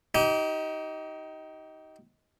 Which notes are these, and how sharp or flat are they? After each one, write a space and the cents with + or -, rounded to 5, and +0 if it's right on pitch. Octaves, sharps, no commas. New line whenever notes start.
D#4 +20 G4 -25